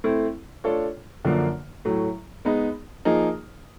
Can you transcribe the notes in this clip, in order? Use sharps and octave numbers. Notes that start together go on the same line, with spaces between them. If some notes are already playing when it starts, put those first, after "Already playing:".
A3 C4 E4
A3 D4 F4 A4 C#5
F#2 D3 F3 A#3 D4
A2 F#3 A3
G#3 B3 D#4
F3 A#3 D#4 G#4